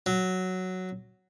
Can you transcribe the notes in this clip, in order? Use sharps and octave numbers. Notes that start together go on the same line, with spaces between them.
F#3